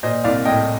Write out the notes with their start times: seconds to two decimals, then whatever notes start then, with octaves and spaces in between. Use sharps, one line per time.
0.03 A#2 C5 D#5
0.24 C2 D5 F5
0.45 A2 D#5 G5